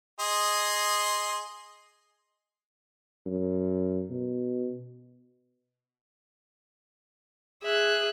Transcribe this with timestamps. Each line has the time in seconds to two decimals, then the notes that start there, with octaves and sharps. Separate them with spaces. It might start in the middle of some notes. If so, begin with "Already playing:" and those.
0.20 G#4 D#5 C6
3.26 F#2
4.10 B2
7.64 G#4 E5 F#6